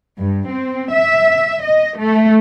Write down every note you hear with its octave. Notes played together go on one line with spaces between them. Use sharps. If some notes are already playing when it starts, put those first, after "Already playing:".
G2
C4
E5
D#5
A3